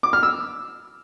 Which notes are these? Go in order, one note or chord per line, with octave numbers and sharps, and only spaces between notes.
D6
F6
E6